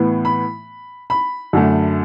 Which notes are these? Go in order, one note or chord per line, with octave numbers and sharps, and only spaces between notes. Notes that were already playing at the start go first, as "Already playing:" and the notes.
Already playing: A2 E3 B3
B5
B5
F#2 D3 A3